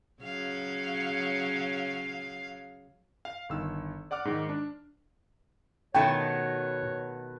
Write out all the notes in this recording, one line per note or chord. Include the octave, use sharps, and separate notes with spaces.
C#3 F#3 F5
F5
G1 D#3 E6
D5 F#5 D6 F6
G#2 D#3
D4
B2 D#3 A3 F#4 B4 C#5 G5 A5